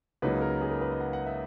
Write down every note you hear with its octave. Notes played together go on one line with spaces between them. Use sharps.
C#2 C#3 F#3 A#3 D#4 B4
A#4
G#4
A#4
B4
D#5
F#5
F#5
E5